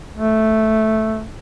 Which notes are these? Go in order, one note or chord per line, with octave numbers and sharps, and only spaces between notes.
A3